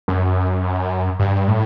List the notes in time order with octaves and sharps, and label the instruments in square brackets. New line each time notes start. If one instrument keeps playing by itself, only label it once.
[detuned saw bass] F#2
G2
A2